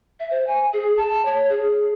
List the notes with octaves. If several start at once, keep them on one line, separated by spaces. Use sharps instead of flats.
E5
C5
G#5
G#4
A5
C#5
G#4